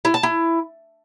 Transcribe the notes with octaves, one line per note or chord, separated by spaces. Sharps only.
E4
A5
E4